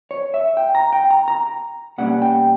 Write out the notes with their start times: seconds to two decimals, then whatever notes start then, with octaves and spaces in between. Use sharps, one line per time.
0.11 C#5
0.34 E5
0.57 G5
0.75 A#5
0.93 G5
1.11 A#5
1.28 A#5
1.98 B2 G3 A#3 C#4 F#5
2.22 G5